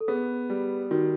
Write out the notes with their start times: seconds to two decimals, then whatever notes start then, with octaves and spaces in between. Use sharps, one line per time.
0.01 A4
0.08 B3 G#4
0.50 G3
0.91 D#3 F#4